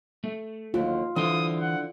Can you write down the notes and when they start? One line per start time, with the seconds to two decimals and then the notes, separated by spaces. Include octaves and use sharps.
0.24 A3
0.74 D#2 D3 F#3 F4
1.16 D3 E3 E4 C5 D#6
1.60 F#5